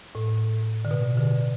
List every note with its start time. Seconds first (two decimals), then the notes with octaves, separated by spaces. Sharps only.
0.15 A2
0.85 D3
0.91 B2
1.18 D3